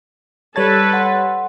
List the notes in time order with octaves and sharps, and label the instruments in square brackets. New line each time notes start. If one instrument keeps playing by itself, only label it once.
[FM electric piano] G3 C#5 A6 [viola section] A4 B4 [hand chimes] A5 G#6
[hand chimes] F#5 C6